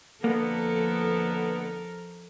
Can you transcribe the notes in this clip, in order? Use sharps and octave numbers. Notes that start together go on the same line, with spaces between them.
F2 D3 A#3 B3 A4 A#4